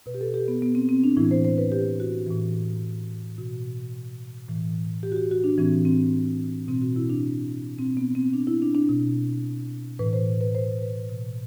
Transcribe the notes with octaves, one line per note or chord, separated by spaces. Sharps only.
B2 B4
G4
A4
G4
B3
B3
C4
C4
D4
A2 E3 E4
C5
C5
B4
G4
F#4
A2 E3
B2 F#4
A2 E3
G4
F#4
G4
F#4
D4
A2 E3 C4
C4
B2 C4
F#4
E4
D4
B2 C4
B3
C4
D4
E4
D4
D4
B2
A2 E3 B4
C5
B4
C5
B4
B2